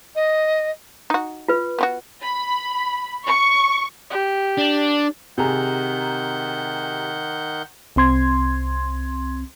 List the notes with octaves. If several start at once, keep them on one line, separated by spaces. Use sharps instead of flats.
D#5
D#4 F#4
F4 B4
B3 C4 F#4
B5
C#6
G4
D4
C3 D#3 G#4 F#5 A#5 G6
C2 C4 C6 G#6